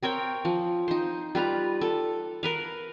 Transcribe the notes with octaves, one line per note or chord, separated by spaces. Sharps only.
C4 A#4 C#5 G5
F3
D#4 C5
G3 F4 B4 A#5
A4
A#4 B4 F5